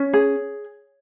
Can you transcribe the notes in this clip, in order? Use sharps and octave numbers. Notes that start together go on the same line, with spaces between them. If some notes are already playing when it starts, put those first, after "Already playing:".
Already playing: C#4 C#5
G#4